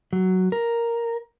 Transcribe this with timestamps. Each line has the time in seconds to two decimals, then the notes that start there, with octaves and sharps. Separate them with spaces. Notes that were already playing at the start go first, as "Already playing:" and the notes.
0.13 F#3
0.52 A#4